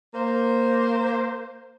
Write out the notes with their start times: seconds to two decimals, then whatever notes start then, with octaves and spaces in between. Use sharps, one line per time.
0.14 A#3 C5